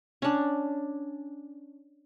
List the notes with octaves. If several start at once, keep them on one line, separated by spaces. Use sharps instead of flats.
C#4 D4